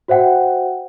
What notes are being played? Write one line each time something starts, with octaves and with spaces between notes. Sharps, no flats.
F#4 C5 E5 F#5 G5